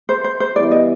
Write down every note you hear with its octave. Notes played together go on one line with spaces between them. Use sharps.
C5
C5
C5
E3 G3 B3 E4 G4 D5
D#5